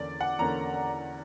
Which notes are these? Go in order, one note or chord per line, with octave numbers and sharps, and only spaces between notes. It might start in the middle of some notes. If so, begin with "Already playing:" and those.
Already playing: E2 D3 A#3 C#4 D5
F#5
E2 D3 A#3 C#4 A#5